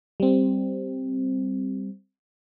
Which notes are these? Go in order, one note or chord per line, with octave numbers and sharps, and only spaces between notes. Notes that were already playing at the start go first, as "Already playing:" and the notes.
G3 C4